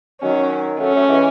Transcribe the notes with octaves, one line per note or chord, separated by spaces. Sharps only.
D#3 F#3 C#4
F#3 A3 C#4
F#3 A3
E3 G#3